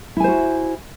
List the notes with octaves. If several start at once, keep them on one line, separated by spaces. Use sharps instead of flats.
E4 F#4 C5 G#5